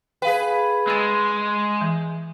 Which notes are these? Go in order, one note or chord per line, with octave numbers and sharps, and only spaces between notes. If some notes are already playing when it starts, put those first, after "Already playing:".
G#4 B4 F5 G5
G#3 E6 A6
E3